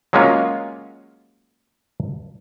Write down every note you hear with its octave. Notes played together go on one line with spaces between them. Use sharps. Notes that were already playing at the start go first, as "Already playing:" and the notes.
F#3 G#3 A#3 C#4 F4